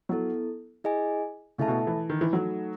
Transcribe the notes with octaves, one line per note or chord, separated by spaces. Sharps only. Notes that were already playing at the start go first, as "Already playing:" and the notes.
F#3 B3 E4 A4
E4 G#4 D#5 G#5
C#3 A3 E4 A4 E5 A5
B2
E3
D#3
E3
F#3 A3 D#4 A4